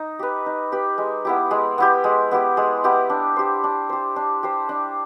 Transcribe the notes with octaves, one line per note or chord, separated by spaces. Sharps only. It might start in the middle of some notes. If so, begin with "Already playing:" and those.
Already playing: D#4
G4 B4
D#4
G4 B4
G#3
B3 E4 G4
G#3
B3 E4 G4
G#3
B3 E4 G4
G#3
B3 E4 G4
D4
G4 C5
D4
G4 C5
D4
G4 C5
D4